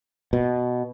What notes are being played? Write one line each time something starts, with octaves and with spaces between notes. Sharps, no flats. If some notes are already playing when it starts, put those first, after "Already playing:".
B2